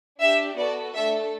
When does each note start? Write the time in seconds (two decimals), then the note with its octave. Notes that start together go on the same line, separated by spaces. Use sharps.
0.20 D4 G4 E5
0.57 B3 F#4 A4 D5
0.94 A3 D4 A4 E5